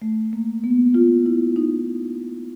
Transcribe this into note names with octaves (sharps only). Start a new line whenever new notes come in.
A3
A#3
B3
F4
E4
D#4